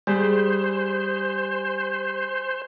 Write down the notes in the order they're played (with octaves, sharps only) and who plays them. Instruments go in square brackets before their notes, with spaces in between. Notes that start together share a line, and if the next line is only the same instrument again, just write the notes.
[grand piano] G3 [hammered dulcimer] G#4 [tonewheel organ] C5